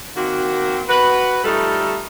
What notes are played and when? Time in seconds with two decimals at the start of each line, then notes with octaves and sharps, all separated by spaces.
0.16 D#3 A#3 C4 F#4
0.88 F#4 B4
1.44 G3 A3 D#4 F4 A4